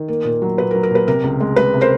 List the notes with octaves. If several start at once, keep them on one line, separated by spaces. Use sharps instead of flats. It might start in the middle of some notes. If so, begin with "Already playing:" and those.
Already playing: D#3
A#3
A#2
F#3
A#2 B4
A#4
F#3
A#4
A#2 B4
C3 A#4
C#2
G#3
G#3 B4
C3
A#4 C5